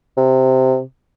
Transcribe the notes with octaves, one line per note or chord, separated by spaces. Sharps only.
C3